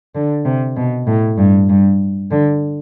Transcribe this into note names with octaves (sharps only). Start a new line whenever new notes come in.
D3
C3
B2
A2
G2
G2
D3